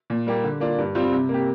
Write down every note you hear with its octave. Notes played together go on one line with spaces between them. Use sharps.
A#2
G3 A#3 G4
D3
A#3 D4 F4
G2
G3 C4 F4
C3
A#3
G4